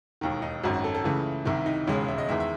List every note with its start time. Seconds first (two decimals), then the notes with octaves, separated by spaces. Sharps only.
0.21 E1 D#2 D#3
0.42 D#4
0.63 G#1 F#2 D#3 F#4
0.74 F#4
0.84 A4
0.95 A4
1.04 C#2 C#3 E3 A3
1.45 C2 C3 D#3 E4
1.66 D#4
1.87 E1 D#2 C#3 G#3 C#4
2.08 E5
2.18 D#5
2.28 E2 D#3 G#3 E5
2.40 E5